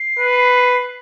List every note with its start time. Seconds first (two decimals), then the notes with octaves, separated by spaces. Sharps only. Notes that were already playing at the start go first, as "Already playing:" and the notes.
Already playing: C7
0.19 B4